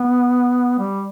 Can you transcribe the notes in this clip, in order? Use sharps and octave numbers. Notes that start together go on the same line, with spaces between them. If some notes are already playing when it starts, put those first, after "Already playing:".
Already playing: B3
G3